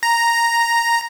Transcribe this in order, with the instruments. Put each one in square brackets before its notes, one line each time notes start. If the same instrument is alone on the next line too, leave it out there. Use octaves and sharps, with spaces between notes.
[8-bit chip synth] A#5